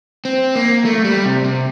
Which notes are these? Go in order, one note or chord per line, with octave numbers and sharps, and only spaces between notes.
C4
A#3
A3
G3
C3
C3